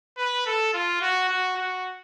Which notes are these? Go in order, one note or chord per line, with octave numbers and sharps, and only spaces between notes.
B4
A4
F4
F#4
F#4
F#4